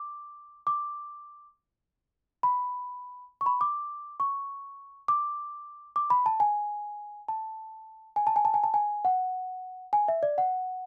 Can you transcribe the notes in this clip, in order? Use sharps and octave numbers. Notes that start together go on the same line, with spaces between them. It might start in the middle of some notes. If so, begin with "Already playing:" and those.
Already playing: D6
D6
B5
C#6
B5
D6
C#6
D6
D6
B5
A5
G#5
A5
G#5
A5
G#5
A5
G#5
A5
G#5
F#5
G#5
E5
D5
F#5